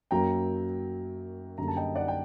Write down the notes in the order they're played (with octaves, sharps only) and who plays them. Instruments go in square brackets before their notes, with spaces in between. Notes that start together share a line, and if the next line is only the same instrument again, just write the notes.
[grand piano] F#2 F#3 A#3 G5 A#5
F#2 D3 G3 A#3 A#5
A5
D#5 G5
D5 F#5
G5